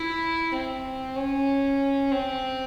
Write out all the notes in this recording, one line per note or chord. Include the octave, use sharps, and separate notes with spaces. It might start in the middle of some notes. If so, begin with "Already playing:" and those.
Already playing: E4
C4
C#4
C4